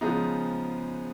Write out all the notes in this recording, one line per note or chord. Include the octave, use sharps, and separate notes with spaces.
C#3 F3 G#3 B3 D#4